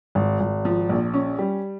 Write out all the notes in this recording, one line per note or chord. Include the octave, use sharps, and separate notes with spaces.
G#1
G#1
F3
A#1
C#4
G3